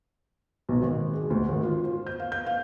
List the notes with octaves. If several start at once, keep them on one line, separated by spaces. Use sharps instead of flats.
B1
G#1
G#3
D2
G#1
F4
C5
G6
F5
G6
F5